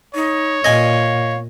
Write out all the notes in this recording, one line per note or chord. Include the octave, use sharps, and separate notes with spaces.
D#4 C#5
A#2 D#5 F5 G#5